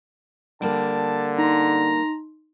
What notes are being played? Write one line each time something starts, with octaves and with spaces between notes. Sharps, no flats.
D3 G3 A#3 A5
D#4 A#5 C6